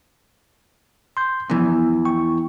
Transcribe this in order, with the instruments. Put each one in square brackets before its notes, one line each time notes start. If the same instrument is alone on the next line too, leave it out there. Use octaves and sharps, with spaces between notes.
[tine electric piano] C6 G6
[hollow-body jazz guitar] E2 E3 [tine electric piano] F3 B3
[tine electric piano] G5 C#6